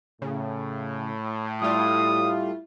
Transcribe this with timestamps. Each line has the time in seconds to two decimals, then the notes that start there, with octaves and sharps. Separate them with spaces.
0.22 A2 C#3
1.62 G3 A3 E4 F4 D#6